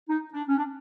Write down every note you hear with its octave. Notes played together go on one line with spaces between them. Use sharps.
D#4
D4
C#4
D4